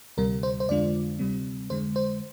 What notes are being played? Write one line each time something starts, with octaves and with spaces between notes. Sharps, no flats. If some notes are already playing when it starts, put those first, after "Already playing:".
D2 C3 G3 A#4
C5
C5
F2 D3 G#3 D4 F4 D5
D2 C3 G3 C4
F2 D3 G#3 C5
C5